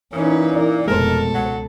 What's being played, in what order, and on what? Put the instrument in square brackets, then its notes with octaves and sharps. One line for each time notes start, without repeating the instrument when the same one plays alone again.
[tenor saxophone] A#2 [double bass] E3 D#4 [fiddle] C#4 B4
[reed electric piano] E4 D5 [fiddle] A#4
[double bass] F1 B2 [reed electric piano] G#3 A3 C5 [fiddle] A4 [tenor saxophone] A#4
[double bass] C#2 [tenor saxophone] F#3